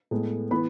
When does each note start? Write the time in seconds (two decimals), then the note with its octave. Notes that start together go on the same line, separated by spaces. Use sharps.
0.11 A2 G#3 B3
0.51 E3 B3 B5